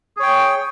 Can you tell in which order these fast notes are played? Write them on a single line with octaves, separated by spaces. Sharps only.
G#4 C#5 G5